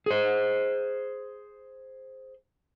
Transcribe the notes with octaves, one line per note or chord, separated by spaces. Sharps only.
G#4 C5